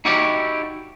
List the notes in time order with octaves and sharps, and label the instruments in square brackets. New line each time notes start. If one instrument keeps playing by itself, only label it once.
[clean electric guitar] D#4 E4 F#4 G4 C#5 D5